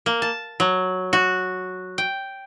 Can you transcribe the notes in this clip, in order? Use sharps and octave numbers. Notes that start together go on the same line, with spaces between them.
A#3
A5
F#3
F#4
G5